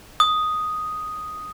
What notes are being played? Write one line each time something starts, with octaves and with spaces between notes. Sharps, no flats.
D#6